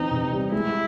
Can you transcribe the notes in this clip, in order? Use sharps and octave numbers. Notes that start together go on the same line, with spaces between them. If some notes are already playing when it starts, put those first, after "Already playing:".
Already playing: E3 C4 D#4
C3
G3
G#3 E4